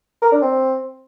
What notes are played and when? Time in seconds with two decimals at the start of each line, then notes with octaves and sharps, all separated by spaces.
0.22 A#4
0.32 D4
0.42 C4